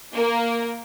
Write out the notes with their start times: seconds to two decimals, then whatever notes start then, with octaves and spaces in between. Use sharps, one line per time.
0.14 A#3